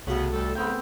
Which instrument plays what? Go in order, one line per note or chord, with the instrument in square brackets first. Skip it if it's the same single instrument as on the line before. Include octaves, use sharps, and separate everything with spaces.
[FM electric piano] C2 F#4 [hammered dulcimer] A2 [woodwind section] C#3 B3
[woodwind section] D2 G3 A4
[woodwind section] C2 C#3 [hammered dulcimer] B3 C4 G5